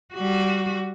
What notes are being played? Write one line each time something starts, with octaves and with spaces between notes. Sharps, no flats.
G3 F#4